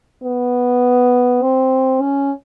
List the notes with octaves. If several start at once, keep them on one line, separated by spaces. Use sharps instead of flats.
B3
C4
C#4